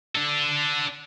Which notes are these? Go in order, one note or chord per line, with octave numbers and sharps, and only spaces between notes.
D4 A4